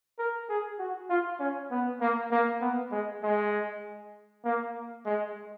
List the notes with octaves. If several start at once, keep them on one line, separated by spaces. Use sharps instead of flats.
A#4
G#4
F#4
F4
C#4
B3
A#3
A#3
B3
G#3
G#3
A#3
G#3